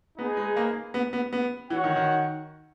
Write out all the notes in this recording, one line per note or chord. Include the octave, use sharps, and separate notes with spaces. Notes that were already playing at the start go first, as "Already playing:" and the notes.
B3 D#4 G#4 B4
G#3
A#3
B3
B3
B3
E3 F#4 C#5 F#5
D#3
D#3